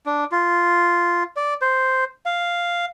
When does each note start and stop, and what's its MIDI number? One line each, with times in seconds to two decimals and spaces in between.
0.06 0.24 62
0.32 1.23 65
1.36 1.54 74
1.62 2.04 72
2.26 2.85 77